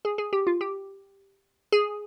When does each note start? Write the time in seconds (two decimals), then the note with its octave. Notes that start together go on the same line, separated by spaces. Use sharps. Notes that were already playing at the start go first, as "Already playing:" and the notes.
0.05 G#4
0.18 G#4
0.33 G4
0.47 F4
0.61 G4
1.72 G#4